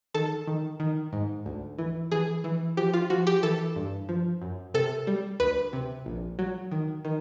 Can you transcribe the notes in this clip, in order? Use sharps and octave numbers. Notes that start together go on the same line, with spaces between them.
D#3 A4
D#3
D#3
G#2
D2
E3
E3 G#4
E3
F3 G4
F4
F3 F#4
G4
E3 A4
G2
F3
F#2
C3 A4
G3
D2 B4
C3
A#1
F#3
D#3
D#3